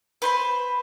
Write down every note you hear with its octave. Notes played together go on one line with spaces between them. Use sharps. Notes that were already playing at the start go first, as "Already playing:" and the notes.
B4 C5 B5